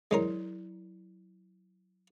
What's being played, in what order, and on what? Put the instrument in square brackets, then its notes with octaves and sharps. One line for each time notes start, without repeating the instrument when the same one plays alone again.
[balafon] F#3 E4 [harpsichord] G#3 C#4 A#4